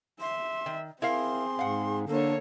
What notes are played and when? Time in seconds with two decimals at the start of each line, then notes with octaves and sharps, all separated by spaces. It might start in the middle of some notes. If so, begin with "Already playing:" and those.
0.20 E5 C6
0.66 D#3
1.02 C4 E4 G#4 A#4 F5 C6
1.59 G#2 F5 F#5
2.07 D3 A#3 A4 C#5